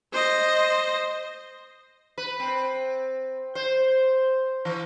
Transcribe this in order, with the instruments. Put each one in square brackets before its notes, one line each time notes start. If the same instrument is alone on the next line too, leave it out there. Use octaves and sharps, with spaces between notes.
[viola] C5 D#5
[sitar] B4
C4
C5
E3